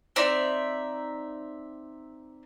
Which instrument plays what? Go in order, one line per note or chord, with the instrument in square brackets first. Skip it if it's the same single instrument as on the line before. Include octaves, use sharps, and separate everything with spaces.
[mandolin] C4 D#4 D5 E5